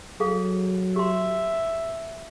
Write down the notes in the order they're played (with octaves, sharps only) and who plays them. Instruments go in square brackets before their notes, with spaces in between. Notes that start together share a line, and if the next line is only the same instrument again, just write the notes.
[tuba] F#3 [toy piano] G#4 A4 F5
[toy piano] G4 C6 [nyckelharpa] E5